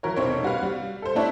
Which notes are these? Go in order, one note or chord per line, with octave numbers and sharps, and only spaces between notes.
E3 F#3 A#4 C#5
F1 B1 C4 C#5
G3 F#4 B4 F5
G3
A4 C5
A3 D4 E4 C#5